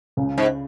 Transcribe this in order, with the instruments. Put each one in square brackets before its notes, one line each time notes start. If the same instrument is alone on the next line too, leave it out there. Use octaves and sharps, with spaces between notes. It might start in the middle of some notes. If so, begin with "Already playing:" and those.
[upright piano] C#2 C#3
[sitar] G#2